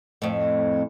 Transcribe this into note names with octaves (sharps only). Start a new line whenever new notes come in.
F2 A2